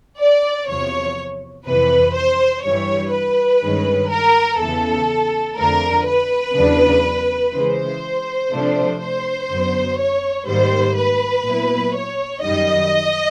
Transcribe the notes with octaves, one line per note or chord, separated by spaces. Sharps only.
D5
E2 C3 F3 C#5
F2 C3 E3 B4
C5
G2 E3 G3 C#5
B4
G2 D#3 G#3 C#4
A#4
E2 C#3 E3 A4
F2 D3 F3 A3 D4 A#4
B4
E2 C#3 F#3 B3 D4
C#3 E3 G#3 C5
C3 F3 A3 D4
C5
F#2 D3 F#3 B3
C#5
G#2 D#3 G3 A#3 C5
B4
A#2 F#3 B3 E4
C#5
F#2 D#3 G3 D#5